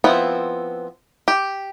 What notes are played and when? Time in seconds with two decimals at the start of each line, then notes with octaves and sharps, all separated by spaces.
0.04 F3 B3 C4 E4
1.28 G4